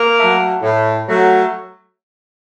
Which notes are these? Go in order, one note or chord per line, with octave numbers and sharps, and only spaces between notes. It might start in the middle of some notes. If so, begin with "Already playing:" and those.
Already playing: A#3 A#4
F#3 A3
A2
F#3 A3